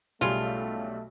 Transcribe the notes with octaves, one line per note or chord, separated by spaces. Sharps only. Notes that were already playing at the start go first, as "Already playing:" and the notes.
B1 C#3 G3 A3 F4